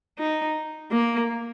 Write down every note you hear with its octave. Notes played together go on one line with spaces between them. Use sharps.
D#4
A#3